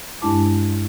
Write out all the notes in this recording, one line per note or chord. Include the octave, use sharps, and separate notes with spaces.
G2 G#3 D4 E4 A5 D6